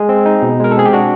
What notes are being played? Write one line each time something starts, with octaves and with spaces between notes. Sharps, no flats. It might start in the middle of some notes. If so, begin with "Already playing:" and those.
Already playing: G#3 G#4
C4
D#4
B2
G#3 A#4
A4
C4 G#4
G4
D4 F#4